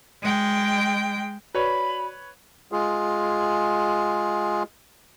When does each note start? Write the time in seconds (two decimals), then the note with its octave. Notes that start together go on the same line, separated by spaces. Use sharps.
0.22 G#3 G5
1.55 F#4 B4 C#5 D5 B5
2.72 G#3 F4 G#4